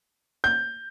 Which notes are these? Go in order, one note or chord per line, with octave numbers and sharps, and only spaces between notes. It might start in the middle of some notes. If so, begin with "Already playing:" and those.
G6